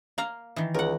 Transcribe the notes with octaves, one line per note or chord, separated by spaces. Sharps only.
A#3 F5 A#5
D#3 E3
C#2 A#4 F#5